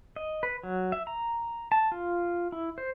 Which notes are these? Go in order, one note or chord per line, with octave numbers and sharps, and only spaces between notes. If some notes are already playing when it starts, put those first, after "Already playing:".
D#5
B4
F#3
E5
A#5
A5
F4
E4
C5